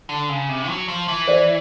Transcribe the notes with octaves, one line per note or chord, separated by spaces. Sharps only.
D3
C#3
C3
F#3
F3
E3
C5 D5